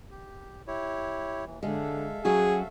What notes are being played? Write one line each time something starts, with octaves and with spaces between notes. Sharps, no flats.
G4
E4 G4 C#5
D#2 E3
D3 G#3 A4 E5 F5
F#3 C#4 F#4 G#4